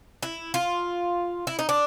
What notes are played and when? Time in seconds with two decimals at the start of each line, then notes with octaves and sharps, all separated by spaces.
0.23 E4
0.54 F4
1.47 E4
1.59 D#4
1.69 D4